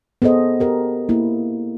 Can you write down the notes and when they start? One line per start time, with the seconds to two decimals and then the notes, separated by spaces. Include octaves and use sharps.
0.22 B3 G#4 A4 C5 D#5
0.60 G4 A#4
1.09 A#3 E4